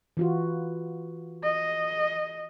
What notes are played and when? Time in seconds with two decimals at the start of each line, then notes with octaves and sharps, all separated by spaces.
0.17 E3 F4 F#4
1.43 D#5